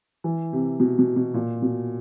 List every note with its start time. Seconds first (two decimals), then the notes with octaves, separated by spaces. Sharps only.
0.24 E3
0.53 C3
0.80 B2
0.99 B2
1.16 B2
1.34 A#2
1.62 B2